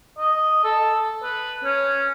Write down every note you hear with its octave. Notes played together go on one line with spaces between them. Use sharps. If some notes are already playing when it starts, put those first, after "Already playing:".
D#5
A4
B4
C#4